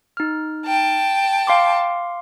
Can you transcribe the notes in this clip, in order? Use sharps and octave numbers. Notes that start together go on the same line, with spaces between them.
D#4 F6
G5 A5
F5 C6 D6